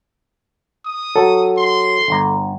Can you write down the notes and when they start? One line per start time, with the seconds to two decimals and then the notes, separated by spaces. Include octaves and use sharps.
0.85 D#6
1.16 F#3 A4
1.57 C6
2.08 G1 A#5